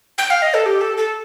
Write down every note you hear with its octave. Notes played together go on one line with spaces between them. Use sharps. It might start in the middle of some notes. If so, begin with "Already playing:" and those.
G5
F5
D#5
A4
G4
A4
A4